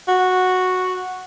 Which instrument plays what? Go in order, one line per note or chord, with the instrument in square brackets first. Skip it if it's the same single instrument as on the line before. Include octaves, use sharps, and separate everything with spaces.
[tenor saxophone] F#4